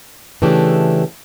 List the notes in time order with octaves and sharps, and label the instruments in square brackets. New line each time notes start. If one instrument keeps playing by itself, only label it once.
[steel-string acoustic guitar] C#3 E3 A3 D4 G4